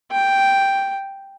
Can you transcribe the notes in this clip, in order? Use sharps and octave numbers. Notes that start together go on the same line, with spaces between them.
G5